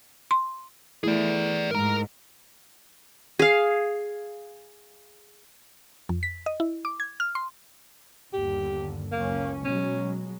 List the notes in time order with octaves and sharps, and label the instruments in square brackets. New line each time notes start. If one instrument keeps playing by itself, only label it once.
[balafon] C6
[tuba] E3 [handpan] A3 E4 [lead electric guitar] G#4 D5
[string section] G#2 [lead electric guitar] A#4 A#5
[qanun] G#4 F5
[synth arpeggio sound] F2
B6
D#5
E4
D6
G#6
F6
C6
[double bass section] G1 D#2 D3 [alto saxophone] G4
[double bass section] F#1 C#2 C#4 [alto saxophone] A#3
[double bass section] B2 F#3 G#3 [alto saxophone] C#4